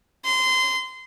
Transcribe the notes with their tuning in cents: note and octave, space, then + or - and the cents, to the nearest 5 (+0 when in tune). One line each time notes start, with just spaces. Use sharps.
C6 -20